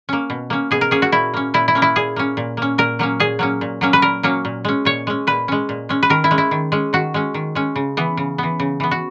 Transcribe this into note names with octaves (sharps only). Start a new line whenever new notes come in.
A#3 C#4
B2
A#3 C#4
B2 G#4
A#4
A#3 C#4 G#4
F#4
A#2 E4
A#3 C#4
A#2 E4
E4
A#3 C#4
E4
A#2 G#4
A#3 C#4
A#2
A#3 C#4
A#2 A#4
F#3 A#3 C#4
A#2 G#4
F#3 A#3 C#4
A#2
F#3 A#3 C#4
B4
A#2 A#4
F#3 A#3 C#4
A#2
G#3 C#4
A#2 C#5
G#3 C#4
A#2 B4
G#3 C#4
A#2
G#3 C#4
B4
D#3 A#4
E4
G#3 C#4
E4
D#3
G#3 C#4
D#3 F#4
G#3 C#4
D#3
G#3 C#4
C#3
E3 B3
C#3
E3 B3
C#3
E3 B3
F#4